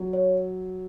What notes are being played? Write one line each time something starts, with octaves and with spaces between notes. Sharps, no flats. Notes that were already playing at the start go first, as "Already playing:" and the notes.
Already playing: F#3
C#5